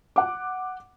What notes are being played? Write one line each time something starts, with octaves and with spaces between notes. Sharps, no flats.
F#5 D6